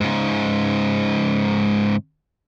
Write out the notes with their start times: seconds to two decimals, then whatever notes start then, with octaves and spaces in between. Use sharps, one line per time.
0.01 G#2 C#3